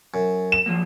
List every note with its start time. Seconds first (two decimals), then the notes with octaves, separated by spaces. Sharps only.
0.14 F#2
0.52 E7
0.66 F3 F#3 A#3